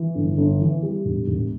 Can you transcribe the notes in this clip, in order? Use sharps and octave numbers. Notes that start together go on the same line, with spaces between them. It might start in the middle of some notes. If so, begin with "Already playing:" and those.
Already playing: E3
G1
G1
E3
G3
E1
E1